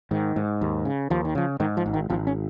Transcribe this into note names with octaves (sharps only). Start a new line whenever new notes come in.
G#2 D#3
G#2
D#2
C#3
D#2 F3
D#3
C#3 F3
G#2 D#3
F3
G#1
D#3
G#1 F3
C#4